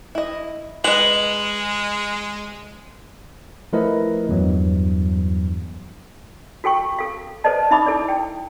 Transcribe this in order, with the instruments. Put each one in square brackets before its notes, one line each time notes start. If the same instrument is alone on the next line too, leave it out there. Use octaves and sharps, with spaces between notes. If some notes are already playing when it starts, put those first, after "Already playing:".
[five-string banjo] E4 D#5
[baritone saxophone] G#3 [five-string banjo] B4 D#5 [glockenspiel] F#7
[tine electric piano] F3 A3 E4 A#4 B4 D#5
E2 G2 E3 F#3
[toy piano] F#4 A4 G5 C#6
A4 F5
A4 B4 C5 D5 D#5 A5
D#4 E5 B5 D6 D#6
E4 A4 D5
G5